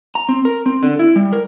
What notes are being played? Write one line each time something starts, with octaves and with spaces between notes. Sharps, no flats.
A#5
C4
A#4
C4
D3
E4
G3
A#4